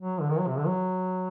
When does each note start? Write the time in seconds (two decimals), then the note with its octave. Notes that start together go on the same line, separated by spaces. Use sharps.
0.01 F#3
0.21 D3
0.30 D#3
0.39 F#3
0.48 C3
0.58 D3
0.67 F#3